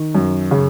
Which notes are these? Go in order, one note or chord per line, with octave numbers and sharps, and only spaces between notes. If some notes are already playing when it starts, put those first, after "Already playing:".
Already playing: D#3
F#2
C#3